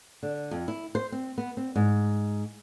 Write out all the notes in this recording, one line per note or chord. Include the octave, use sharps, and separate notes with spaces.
D3
F2
E4
C5
C4
B3
C4
G#2